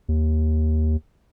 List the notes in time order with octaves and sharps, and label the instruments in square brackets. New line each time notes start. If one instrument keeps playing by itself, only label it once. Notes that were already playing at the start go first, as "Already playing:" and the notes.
[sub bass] D#2